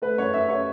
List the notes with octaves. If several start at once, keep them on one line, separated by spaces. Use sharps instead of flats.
A3 B4
F#2 C#5
F#2 E5
C#5